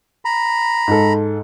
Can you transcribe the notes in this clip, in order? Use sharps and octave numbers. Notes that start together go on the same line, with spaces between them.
A#5 B5
G#2 A4